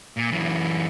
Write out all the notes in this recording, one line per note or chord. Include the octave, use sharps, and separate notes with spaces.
A#2
F#2 E3